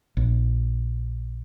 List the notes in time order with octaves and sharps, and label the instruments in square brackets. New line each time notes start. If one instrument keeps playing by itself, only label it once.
[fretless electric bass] A#1